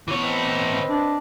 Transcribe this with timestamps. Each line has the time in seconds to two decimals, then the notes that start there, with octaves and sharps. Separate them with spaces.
0.08 E3 B3 C#5
0.23 C4 B4 D#5
0.89 D4